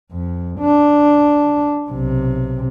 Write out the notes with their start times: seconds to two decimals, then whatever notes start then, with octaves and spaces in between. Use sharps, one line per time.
0.12 F2
0.60 D4
1.91 B1 C3